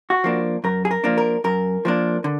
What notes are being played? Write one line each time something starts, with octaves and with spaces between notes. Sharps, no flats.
F#4
F3 A#3 D4
F#2 A#4
G#4
A#4
F3 A#3 D4
A#4
F#2 A#4
F3 A#3 D4
D3